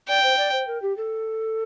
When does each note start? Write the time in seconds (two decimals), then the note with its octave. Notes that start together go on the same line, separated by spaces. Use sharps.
0.08 D5 G5
0.23 C5
0.38 D5
0.52 C5
0.67 A#4
0.82 G4
0.97 A4